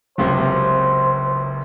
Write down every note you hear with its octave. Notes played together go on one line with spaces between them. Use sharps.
F#1 C#2 C3 C5